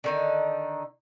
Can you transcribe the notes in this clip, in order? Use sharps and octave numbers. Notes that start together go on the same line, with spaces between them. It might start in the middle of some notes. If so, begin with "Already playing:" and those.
D3 D#3 D#4